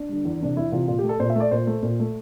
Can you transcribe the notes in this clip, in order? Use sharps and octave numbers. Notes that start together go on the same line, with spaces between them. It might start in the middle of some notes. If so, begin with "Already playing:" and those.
Already playing: D4
D3 G3
E2
C3 E3 D4
E2 E4
C3 E3 F4
A#2 F4
G4
A3
A4
A#2 C5
E5
A3 D5
A#2 C5
A3
A#2
A3